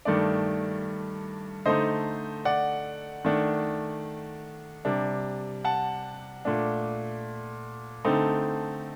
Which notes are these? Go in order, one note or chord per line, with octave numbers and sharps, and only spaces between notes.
G2 D#3 A3 D4 D5
D3 A3 D#4 C5 D#5
D5 F#5
D#3 A3 D4
C3 G3 D4
F#5 A5
A#2 A3 D4
D3 A3 C4 D#4